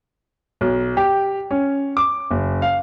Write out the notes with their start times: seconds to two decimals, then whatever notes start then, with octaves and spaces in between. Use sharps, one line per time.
0.61 B1
0.97 G4
1.51 C#4
1.97 D6
2.31 F#1
2.62 F5